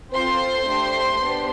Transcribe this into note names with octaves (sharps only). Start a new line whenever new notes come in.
C4 F4 A4 C5 C6
A3 D4 G4
B3 D4 G4